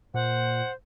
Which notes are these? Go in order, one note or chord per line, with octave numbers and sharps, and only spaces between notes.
A#2 C5 F#5